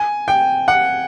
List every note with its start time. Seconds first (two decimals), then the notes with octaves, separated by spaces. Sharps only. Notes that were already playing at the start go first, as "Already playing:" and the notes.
Already playing: G#5
0.28 G5
0.68 F#5